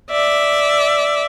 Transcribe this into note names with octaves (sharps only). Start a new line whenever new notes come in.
D5 E5